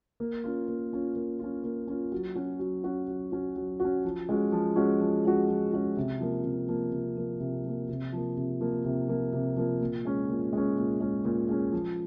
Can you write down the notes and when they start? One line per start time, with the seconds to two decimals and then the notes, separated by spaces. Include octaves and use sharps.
0.20 A#3
0.44 C#4 F4
0.68 A#3
0.93 C#4 F4
1.16 A#3
1.40 C#4 F4
1.64 A#3
1.87 C#4 F4
2.12 F#3
2.35 C#4 F#4
2.59 F#3
2.84 C#4 F#4
3.08 F#3
3.32 C#4 F#4
3.56 F#3
3.80 C#4 F#4
4.05 F3
4.29 G#3 C#4 F#4
4.52 F3
4.76 G#3 C#4 F#4
5.00 F3
5.25 G#3 C#4 F#4
5.48 F3
5.73 G#3 C#4 F#4
5.97 C3
6.20 F3 A#3
6.44 C3
6.68 F3 A#3
6.92 C3
7.17 F3 A#3
7.40 C3
7.64 F3 A#3
7.89 C3
8.13 F3 A#3
8.37 C3
8.61 F3 A#3
8.85 C3
9.08 F3 A#3
9.33 C3
9.57 F3 A#3
9.81 A#2
10.05 G#3 C#4
10.29 A#2
10.53 G#3 C#4
10.77 A#2
11.00 G#3 C#4
11.25 A#2
11.49 G#3 C#4
11.73 F3